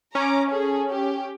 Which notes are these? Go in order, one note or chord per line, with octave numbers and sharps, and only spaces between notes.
C#4 A#5 D6
G#4 A4
G4